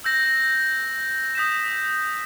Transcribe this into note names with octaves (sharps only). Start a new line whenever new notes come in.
E6 G6 A#6
D#6 G6 B6 E7